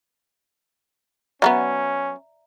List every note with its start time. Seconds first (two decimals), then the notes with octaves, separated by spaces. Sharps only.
1.42 F#3 G#3 B3 C#4 D5 E5 A#5